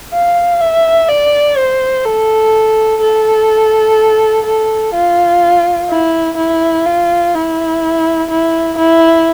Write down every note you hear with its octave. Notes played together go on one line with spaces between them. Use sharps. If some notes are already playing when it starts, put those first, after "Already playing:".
F5
E5
D5
C5
A4
A4
A4
F4
E4
E4
F4
E4
E4
E4